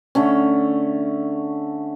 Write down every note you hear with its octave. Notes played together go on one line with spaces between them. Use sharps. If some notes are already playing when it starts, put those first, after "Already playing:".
D3 A3 C#4